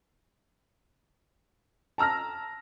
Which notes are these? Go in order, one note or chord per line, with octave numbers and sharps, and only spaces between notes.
A5 A#5 E6 F6 A#6